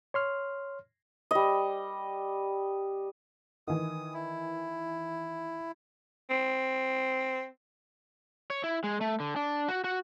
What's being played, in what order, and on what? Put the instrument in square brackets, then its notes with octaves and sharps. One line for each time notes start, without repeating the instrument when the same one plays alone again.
[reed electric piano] C#5 C6 F6
[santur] G3 D#5
[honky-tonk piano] D#3 E3 [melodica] D#6
[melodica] E4
[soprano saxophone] C4
[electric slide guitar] C#5
E4
G#3
A3
D3
D4
F#4
F#4